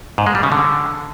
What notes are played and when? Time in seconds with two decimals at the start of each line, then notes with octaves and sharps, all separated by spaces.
0.18 G#2
0.26 G#3
0.35 G3
0.43 C#3
0.52 D3